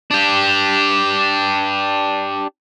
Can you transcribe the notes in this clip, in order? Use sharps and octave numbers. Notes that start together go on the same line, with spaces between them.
D4 G4